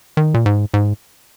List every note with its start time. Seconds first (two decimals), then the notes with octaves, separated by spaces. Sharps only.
0.17 D#3
0.34 A#2
0.46 G#2
0.74 G#2